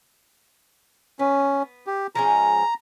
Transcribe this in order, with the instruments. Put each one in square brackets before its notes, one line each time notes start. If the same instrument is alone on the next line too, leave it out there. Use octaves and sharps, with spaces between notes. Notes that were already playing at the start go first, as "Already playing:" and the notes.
[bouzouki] B3 [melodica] C#4
[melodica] G4
[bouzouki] F3 G#3 C#4 [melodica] A#5